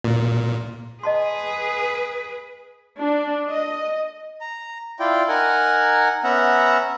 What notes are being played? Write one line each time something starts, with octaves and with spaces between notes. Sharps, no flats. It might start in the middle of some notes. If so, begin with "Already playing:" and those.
A#2
G#4 B4 D#5 A5 C6
D4
D#5
A#5
E4 F4 D5 G5
D#4 A#4 F#5 G#5
B3 C#4 E5 F#5 A#5